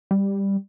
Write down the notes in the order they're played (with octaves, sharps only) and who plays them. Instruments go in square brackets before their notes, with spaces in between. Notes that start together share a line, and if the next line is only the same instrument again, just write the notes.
[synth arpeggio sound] G3